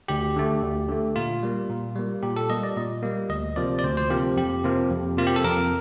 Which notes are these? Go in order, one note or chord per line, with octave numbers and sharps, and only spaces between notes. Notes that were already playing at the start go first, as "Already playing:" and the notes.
D2 G4
D3 A3
D2
D3 A3
A#2 F4
G3 A#3
A#2
G3 A#3
A#2 G4
A4
G3 A#3 D#5
D5
A#2 D#5
G3 A#3
D2 D#5
C3 F3 A#3 D5
D5
D2 C5
C5
C3 F3 A#3 G4
F2 G4
C3 F3 A#3
F2
C3 F3 A#3 F4
G4
A4
F2 A#4